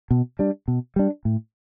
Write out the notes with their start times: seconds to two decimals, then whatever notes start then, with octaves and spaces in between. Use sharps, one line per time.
0.11 B2
0.39 G3 D4
0.68 B2
0.96 G3 D4
1.25 A2